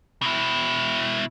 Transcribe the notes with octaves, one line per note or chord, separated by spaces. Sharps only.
B2 E4